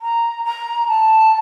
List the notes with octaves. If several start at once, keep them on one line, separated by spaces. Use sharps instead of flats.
A#5
A#5
A5